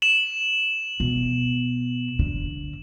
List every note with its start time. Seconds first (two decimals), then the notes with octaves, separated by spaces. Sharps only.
0.02 E7 F#7
1.00 B2
2.19 D3